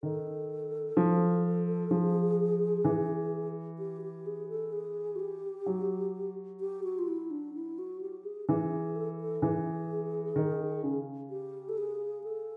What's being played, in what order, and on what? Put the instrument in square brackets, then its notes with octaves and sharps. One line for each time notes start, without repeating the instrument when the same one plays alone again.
[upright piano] D#3 [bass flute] A4
[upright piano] F3
[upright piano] F3 [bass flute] G#4
[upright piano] E3
[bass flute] G4
G4
G#4
A4
G#4
F#4
G4
[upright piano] F#3
[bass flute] G4
F#4
F4
E4
D4
E4
F#4
G4
G#4
[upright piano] E3 [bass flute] G#4
[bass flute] A4
A4
[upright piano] E3 [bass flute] G#4
[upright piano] D#3
C#3
[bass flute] G4
A4
G#4
A4